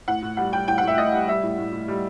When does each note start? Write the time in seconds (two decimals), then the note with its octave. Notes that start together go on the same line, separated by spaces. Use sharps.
0.08 A2 F#5
0.22 A2
0.37 G3 F#5
0.52 G3 G5
0.68 A2 G5
0.78 F#5
0.83 A2 E5
0.97 A2 D#5
1.12 G3
1.27 G3 E5
1.43 A2
1.58 A2
1.72 A2
1.88 G3